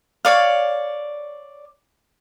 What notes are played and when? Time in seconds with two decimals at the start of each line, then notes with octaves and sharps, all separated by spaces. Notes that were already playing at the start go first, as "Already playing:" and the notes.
0.25 C#5 D5 F5